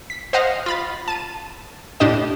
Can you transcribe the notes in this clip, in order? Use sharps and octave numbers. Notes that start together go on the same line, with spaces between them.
B6
C5 D#5 F5 F#5 A#6
F4 B5 A6
A5 D#7
A2 D4 G4 D#5 E7